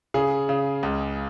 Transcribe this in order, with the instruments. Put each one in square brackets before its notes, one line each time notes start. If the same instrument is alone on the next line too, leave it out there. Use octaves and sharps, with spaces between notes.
[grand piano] C#3 G#4
C#3
C#2